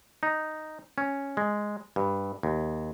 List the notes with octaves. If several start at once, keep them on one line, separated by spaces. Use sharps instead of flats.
D#4
C#4
G#3
G2
D#2